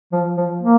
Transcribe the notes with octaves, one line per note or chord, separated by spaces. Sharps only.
F3
F3
A#3